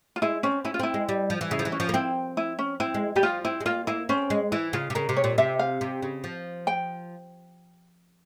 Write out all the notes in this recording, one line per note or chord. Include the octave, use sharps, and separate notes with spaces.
F4
G#3 E4
C4 C#4
C#4 E4
F4
C4 E4
G#3
G3
F3
E3
C#3 E4
F3
E3
C#4
F3
A#3
C4 E4
E4
C#4
C4 E4
G#3
G3 G4
F3 F4
C4 E4
G#3
A#3 F4
A#3 E4
C4 C#4
G#3
E3 E4
C#3 F4
C3
C#3 A#4
C3
C#5
A#2
C3 E5
F5
C3
C#3
F3
G5